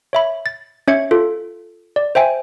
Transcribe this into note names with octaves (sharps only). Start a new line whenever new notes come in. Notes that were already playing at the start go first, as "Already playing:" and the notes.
C#5 E5 B5
A6
C#4 C#5 E5 G#6 C#7
F4 A4
D5
C5 E5 G5 G#5